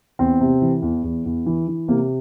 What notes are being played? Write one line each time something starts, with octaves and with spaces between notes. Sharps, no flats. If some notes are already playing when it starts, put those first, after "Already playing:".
E2 C4
C3
E3
E2
E2
E2
E3
E3
C3 A#3